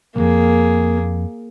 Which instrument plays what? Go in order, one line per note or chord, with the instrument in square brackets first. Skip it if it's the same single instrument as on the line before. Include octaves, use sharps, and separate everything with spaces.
[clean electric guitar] B1 F2 [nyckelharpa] A#3 G#4